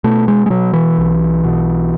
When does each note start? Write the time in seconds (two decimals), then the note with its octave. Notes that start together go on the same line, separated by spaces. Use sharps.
0.04 B2 A3
0.28 G#3
0.46 G#3
0.50 B2 F#3
0.73 E3
0.98 B1
1.45 B2